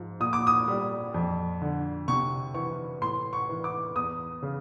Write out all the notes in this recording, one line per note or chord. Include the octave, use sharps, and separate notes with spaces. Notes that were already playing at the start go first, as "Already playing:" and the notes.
Already playing: G#2 F3
A#2 D#6
D6
D#6
G3
F2
D3
C3 C#6
E3 C#6
A2 C6
C#6
E3
D6
E2 D#6
C#3